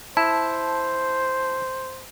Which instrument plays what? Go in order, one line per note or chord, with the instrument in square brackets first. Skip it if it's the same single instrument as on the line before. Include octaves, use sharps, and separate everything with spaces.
[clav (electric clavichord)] E4 [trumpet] C5 [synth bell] A5